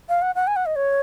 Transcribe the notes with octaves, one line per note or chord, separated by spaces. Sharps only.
F5
F#5
F#5
G#5
F#5
D#5
C#5